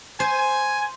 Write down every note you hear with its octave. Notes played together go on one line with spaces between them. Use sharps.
C5 G#5